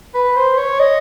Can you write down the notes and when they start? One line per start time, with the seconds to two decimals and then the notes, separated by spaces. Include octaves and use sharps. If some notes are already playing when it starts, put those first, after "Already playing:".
0.15 B4
0.36 C5
0.58 C#5
0.80 D#5